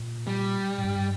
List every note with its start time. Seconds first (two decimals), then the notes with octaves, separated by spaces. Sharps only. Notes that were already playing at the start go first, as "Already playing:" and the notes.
Already playing: A#2
0.27 G3
0.78 A2
0.84 G2